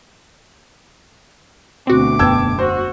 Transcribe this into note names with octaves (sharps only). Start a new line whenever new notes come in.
D2 B2 C4 F#4 D6
E1 F#2 B3 G5 A5 E6 G#6
F#4 C5